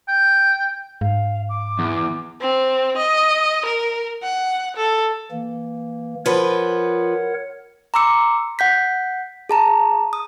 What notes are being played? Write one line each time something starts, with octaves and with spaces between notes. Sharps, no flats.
G5
G#2 F5
D6
E2
C4
D#5
A#4
F#5
A4
E3 A#3
F3 A#4 B4 C#5 F#5
A#5 C6 D6 E6 C#7
F#5 G6 B6
G#4 A5 A#5
D#6